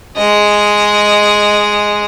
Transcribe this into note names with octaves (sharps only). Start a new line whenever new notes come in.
G#3 D#5